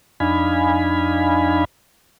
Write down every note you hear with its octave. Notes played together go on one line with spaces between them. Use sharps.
F2 D4 D#4 F5 G#5 B5